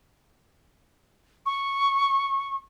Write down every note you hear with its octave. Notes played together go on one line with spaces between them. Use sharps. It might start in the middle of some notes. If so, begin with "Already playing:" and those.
C#6